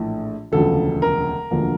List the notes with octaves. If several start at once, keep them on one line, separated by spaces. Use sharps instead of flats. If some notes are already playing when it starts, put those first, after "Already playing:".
Already playing: A#1 A2 E3 A3
E1 D2 C#3 F3 A4
A#4
E1 D2 D3 F3 A#3